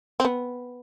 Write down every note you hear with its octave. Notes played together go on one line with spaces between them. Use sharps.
C4
B3